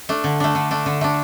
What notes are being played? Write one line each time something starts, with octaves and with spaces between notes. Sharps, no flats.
A3 D4
D3
A3 D4
D3
A3 D4
D3
A3 D4